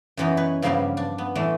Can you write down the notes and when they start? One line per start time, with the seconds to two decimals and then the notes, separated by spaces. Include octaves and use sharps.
0.17 F#2 B2 E3 B3 D#4 A#5
0.37 B4 C#5
0.62 G2 C#3 F3 A#3 B3 G4
0.97 D4
1.18 B3
1.35 A2 E3 A3 D4